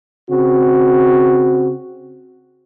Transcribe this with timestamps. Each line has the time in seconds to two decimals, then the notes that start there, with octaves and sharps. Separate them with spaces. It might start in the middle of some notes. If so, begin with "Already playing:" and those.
0.31 C#3 C4 F#4